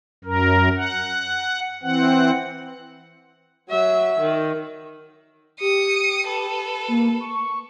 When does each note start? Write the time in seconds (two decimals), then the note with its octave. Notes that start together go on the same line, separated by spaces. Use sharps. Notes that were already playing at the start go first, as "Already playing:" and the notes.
0.25 F#2 A#4
0.77 F#5
1.83 E3 C4 F#5
3.70 F#3 E5
4.21 D#3
5.60 G4 D#6 C#7
6.28 A4 B4
6.88 A#3
7.20 C#6